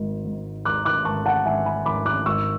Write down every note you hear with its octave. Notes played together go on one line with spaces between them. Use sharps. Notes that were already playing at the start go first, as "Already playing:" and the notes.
Already playing: G#1 G#2
G#2
G#1 D6 F#6
D6 F#6
G#1 A5 C#6
F#5 A5
G#1 E5 G#5
G#5 B5
G#1 B5 D6
D6 F#6
G#1 C#6 E6